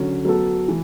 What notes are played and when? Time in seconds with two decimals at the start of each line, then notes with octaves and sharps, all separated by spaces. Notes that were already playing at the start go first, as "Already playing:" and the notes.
Already playing: D3 F#3 C#4
0.25 F#3 B3 F#4 A4
0.68 E3